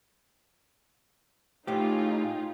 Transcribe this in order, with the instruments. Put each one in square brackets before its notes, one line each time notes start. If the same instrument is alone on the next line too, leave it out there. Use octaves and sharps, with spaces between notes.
[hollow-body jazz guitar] A2 G4 [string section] D#4 F4 G#4